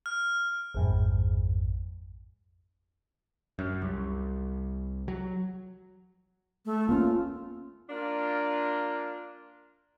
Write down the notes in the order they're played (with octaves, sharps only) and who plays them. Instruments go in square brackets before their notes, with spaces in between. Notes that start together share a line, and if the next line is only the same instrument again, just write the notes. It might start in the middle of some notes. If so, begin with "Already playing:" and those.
[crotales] F6
[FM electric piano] A1 F2 G#2
[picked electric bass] F#2
C2
F#3
[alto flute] A3
[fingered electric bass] A#3 B3 C#4 [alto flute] F4
[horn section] A#3 D4 F4